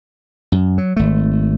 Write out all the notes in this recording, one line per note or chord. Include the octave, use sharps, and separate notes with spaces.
F#2
F#3
G#1 A3